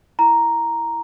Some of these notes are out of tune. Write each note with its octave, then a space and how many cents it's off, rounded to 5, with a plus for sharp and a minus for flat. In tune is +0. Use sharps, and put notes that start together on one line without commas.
E4 +0 A#5 +0